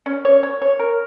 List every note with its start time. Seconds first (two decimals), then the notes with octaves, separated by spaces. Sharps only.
0.06 C#4
0.25 C#5
0.43 C#5
0.62 C#5
0.79 A#4